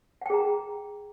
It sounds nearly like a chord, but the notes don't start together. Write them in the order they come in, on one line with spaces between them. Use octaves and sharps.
F#5 G5 G#4 A#5